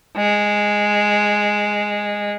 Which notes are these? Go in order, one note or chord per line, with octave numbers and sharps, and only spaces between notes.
G#3